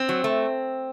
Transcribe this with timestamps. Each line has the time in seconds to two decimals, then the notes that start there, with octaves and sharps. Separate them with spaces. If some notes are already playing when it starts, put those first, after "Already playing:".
Already playing: C4
0.09 F#3
0.24 A3